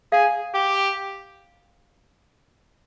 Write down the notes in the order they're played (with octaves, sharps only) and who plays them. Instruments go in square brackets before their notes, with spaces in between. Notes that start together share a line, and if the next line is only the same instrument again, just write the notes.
[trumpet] G#4 [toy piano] F5
[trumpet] G4